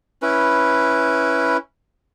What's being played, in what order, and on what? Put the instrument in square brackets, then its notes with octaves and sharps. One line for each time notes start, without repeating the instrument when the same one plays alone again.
[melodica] C#4 E4 B4